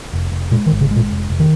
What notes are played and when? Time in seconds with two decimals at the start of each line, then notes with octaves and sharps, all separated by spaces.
0.13 F1
0.32 F1
0.51 A#2 G#3
0.66 D#3
0.72 G#1
0.81 C#3
0.91 G#3
0.96 A#2
1.11 F1
1.30 F1
1.40 D#3